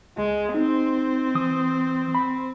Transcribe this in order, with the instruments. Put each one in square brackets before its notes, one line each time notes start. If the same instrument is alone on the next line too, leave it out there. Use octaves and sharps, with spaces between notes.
[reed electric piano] C#2 [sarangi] G#3
[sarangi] C4 [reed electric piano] D#4
[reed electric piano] E3 D#6
B5